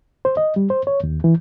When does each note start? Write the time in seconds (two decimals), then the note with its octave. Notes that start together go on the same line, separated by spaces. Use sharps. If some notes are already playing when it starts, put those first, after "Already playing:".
0.25 C5
0.37 D#5
0.56 G3
0.70 C5
0.87 C#5
1.03 D#2
1.24 E3